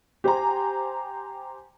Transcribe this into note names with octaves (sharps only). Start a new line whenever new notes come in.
G4 C5 G#5 A#5